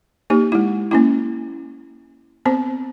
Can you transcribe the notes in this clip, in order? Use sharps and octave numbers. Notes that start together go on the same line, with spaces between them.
A#3 D#4 G4
G#3 E4
A#3 C#4 E4
B3 C4 C5